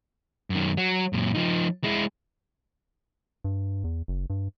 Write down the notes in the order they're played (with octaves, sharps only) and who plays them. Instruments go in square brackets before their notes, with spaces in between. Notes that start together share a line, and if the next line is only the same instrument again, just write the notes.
[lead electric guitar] F#2 D#3
F#3
F#2 A#2
F3 D#4
G#3 E4
[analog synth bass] G2
E2
F#1
G2